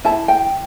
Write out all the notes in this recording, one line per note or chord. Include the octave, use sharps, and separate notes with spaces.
E4 A5
G5